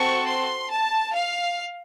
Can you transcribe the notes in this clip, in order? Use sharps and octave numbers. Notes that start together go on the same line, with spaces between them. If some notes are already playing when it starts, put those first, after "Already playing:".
Already playing: C4 F#4 A4 C#6
C6
A5
F5